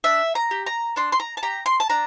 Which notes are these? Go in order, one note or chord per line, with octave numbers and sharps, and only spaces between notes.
D4 E5
A#5
G4
A#5
D4 C6
C6
A#5
A5
G4 A#5
C6
A5
D4 A#5